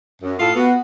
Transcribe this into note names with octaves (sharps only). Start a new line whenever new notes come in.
F#2
A2 F4 A4 F5
B3 F#4